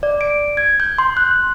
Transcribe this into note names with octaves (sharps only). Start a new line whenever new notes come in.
D5
D7
G#6
G6
C6
F#6